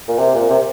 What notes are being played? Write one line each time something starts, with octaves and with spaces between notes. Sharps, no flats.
A#2
C3
A#2
C3